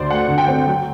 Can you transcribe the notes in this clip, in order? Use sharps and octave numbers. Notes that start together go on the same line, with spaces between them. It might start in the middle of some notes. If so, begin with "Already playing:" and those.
Already playing: D2 D3 C5 D5
A3 F#5
D3
G5
C4
F#3